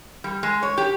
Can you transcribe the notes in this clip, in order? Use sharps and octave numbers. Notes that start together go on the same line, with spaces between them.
G3
G#3
C#5
G4